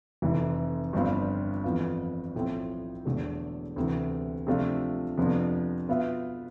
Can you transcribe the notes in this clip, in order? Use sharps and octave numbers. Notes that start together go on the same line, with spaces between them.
F1 F2 E3
G1 G2 F3 C4 F4
F2 E3 B3 F4
B1 A2 F3 C4
E1 E2 D3 A3
D2 C3 E3
C3 F3 A3 D4 F4
F2 C3 F3 B3 D4
B2 B3 F4 B4 E5